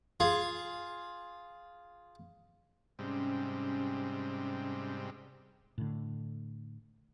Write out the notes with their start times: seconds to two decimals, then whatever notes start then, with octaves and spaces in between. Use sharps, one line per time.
0.20 F4 G#4
2.99 G#2 C3 G3 C#4
5.78 A2 D3